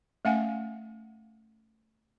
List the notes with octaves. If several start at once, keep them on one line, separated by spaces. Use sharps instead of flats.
A3 C#4 F5 F#5 G#5